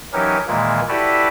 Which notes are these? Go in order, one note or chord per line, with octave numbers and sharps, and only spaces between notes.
E3 F#3 C#4 D#4 G4 A#4
A#2 D#3 E3 G#3 A#3
E4 F#4 G4 A4 B4 D5